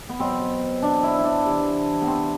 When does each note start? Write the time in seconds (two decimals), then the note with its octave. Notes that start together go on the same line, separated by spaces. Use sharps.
0.09 B3
0.20 B2 F#3 C4
0.82 D4
1.03 E4
1.18 E4
1.24 D4
1.45 C3 E3
2.01 B3
2.07 C4